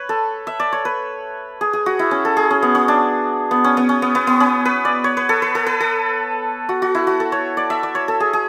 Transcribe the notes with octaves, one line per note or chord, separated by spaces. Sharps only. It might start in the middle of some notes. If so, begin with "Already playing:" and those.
Already playing: B4 C#5
A4
E5
D5
C#5
B4
G#4
G#4
F#4
E4
C#4
A4
G#4
C#4
B3
C#4
D4
B3
C#4
B3
C#4
B3
B3
B3
C#4
B4
D5
C#5
B4
A4
B4
A4
B4
A4
F#4
F#4
E4
F#4
A4
C#5
D5
E5
D5
C#5
A4
G#4
G#4